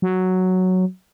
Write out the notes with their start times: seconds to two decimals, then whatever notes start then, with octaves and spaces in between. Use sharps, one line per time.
0.02 F#3